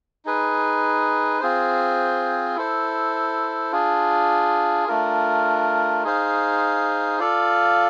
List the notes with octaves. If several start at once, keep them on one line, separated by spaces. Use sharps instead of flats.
D#4 G#4 B4
C4 F4 G#4 C5
E4 A4 C5
D4 F4 G#4
A3 D4 F4 A#4
D#4 G#4 C5 F5
F4 A4 D5 F5